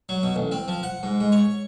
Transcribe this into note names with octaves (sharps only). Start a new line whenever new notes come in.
F#3
B2
A1
C4
F3
F#5
G#2
G#2
C#5